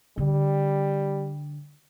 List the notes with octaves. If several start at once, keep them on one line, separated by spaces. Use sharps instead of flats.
D3 G3